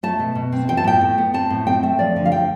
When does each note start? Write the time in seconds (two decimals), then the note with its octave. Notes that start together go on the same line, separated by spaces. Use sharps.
0.03 A3 A5
0.19 B2
0.35 B2
0.52 C4
0.68 E3 G5
0.77 A5
0.84 A2 G5
1.01 A2
1.18 B3
1.34 C4 A5
1.50 A2
1.67 C4 G5
1.83 A3 E5
1.99 F3 D5
2.16 D3
2.26 F5
2.32 D3 G5